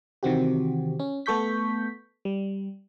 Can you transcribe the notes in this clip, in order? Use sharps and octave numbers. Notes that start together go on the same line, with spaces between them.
C3 D#3 E3 C4 F#4 G4
C#4
A3 B3 A4 C#6 G6 B6
G3